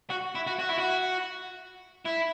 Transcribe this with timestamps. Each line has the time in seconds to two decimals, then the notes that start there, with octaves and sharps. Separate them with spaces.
0.10 F#4
0.35 E4
0.47 F#4
0.59 F#4
0.69 E4
0.78 F#4
2.05 E4